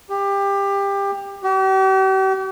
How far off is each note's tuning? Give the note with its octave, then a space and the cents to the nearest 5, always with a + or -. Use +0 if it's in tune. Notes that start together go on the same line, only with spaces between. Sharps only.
G4 +20
G4 -45